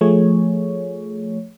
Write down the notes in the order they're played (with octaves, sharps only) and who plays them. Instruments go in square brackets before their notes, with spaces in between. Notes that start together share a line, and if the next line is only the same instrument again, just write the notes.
[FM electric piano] F3 A3 G#4 C#5